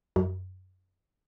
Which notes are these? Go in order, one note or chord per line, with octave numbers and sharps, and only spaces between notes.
F#2